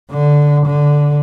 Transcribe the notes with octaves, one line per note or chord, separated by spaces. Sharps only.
D3
D3